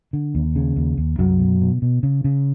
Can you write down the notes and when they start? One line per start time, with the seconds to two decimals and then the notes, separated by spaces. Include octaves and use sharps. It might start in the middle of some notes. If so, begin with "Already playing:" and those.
0.13 D3
0.35 D#2
0.55 C#3
0.76 D#2
0.98 D#2
1.19 C2 F#2 F#3
1.39 B2
1.61 B2
1.82 B2
2.03 C#3
2.24 C#3